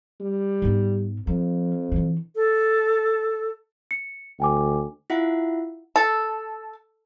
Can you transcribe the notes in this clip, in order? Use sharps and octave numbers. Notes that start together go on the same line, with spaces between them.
G3
G#2 B3
F2 F3
D3 E3
A4
C#7
D2 G5 G#5 D6
E4 F4 E5 F#5
A4